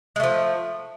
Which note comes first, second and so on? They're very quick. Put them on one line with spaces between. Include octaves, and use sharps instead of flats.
G#3 A3 F3